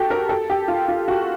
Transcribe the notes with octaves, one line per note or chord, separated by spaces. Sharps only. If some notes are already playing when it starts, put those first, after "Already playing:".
Already playing: F#4 G4 A4
A#4
A4
G4
F4
F4
F#4